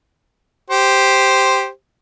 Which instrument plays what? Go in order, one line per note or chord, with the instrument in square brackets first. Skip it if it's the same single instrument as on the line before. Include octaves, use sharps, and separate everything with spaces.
[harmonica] G4 C5